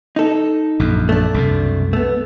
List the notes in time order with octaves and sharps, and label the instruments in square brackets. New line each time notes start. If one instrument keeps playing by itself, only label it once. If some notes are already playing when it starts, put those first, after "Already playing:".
[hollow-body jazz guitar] D#4 A4
[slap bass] A#1 F#2
[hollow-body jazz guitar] A3 D4
[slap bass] C2 F#2 B2
[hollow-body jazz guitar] A3 B3